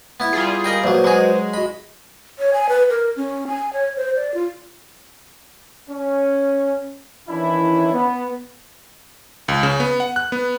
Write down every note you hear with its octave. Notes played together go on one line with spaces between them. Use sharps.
B3 E4
G3 F4 G#4
A#4 D#5 G5
A#1 F#3 F#4 B4 C5
F#3 G#3 G#4
F#4 D#5 B5
C#5
G#5
B4
A#4
C#4
G#5
C#5
C5
D5
F4
C#4
D#3 E3 C#4 D4 E4
B3
C#2
C#3
B3
F#5
F#6
B3